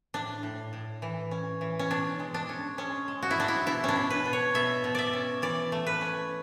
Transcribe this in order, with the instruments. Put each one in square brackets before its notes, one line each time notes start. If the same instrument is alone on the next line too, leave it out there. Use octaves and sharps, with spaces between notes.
[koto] A2 D4
A2
A2
E3
C#4
E3
C#4
B2 D4
G#3
D4
C#4
G#3 C#4
G#3
F#4
E4
G#3 D4
E4
B2 E4
C#4 D4
B2
B4
B2
C#5
B2 E5
B2
D5 E5
C#4
E3 D5
A3
B4
C#4